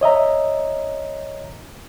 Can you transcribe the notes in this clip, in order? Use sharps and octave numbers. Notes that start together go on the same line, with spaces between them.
C#5 D#5 E5 A#5